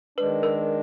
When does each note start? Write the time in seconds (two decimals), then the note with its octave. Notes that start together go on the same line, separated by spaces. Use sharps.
0.18 D#3 G#3 D4 B4
0.43 A#4